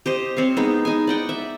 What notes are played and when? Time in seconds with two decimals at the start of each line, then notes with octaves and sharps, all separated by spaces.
0.06 G4 C5 D#5
0.37 C4 C#5 F5
0.57 G#3 B3 D#4
0.85 D#4 G#5
1.07 D5 F#5 G5
1.29 E5